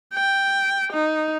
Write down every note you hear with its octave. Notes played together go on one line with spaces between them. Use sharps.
G5
D#4